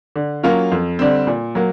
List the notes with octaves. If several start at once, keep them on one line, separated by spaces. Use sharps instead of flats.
D3
F#3 A#3 C#4 F4
F2
D3 G3 C4
A#2
F#3 A#3